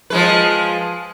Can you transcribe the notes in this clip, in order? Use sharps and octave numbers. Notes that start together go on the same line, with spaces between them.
F3 G#3 B4